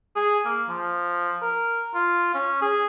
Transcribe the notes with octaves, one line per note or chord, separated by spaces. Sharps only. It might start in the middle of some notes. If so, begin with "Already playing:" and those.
G#4
A#3
F3
A#4
F4
C#4
G#4